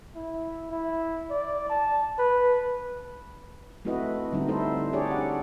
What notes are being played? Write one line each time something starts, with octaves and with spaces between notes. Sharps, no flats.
E4
E4
D5
A5
B4
A3 C4 E4 F#4 B4 D#5
D3 G3 C4 D#4
G3 A3 E4 A4 C5
D4 G4 G#4 C#5 D5
F#5